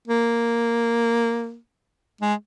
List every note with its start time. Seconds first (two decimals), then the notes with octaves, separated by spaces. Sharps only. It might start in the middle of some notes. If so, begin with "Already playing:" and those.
0.08 A#3
2.21 G#3